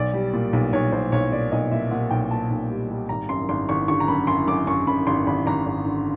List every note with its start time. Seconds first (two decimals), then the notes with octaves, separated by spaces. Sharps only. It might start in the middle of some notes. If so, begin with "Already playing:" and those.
Already playing: B1 D5
0.14 G3
0.33 A#2
0.53 B1
0.73 B1 C#5
0.92 B1 C5
1.12 B1 C#5
1.32 A#2 D5
1.52 B1 D#5
1.71 A#2 E5
1.91 A#2 F#5
2.11 B1 G5
2.31 A#2 A5
2.50 B1
2.70 G3
2.90 G3
3.09 G#1 A#5
3.29 F#2 C6
3.49 G#1 C6
3.69 G#1 C#6
3.88 D3 C#6
4.00 A#5
4.08 F#2 B5
4.27 F#2 C6
4.48 F#2 D6
4.67 F#2 C#6
4.87 F#2 B5
5.07 G#1 C6
5.27 G#1 B5
5.47 G#1 A#5
5.66 G#1
5.85 D3